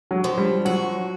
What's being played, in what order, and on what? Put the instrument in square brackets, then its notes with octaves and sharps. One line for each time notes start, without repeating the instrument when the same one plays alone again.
[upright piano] F#3
[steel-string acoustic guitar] F3
[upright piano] G3
[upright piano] F#3 [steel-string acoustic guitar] F#4